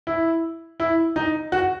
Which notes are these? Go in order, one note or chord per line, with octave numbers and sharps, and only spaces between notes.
E4
E4
D#4
F#4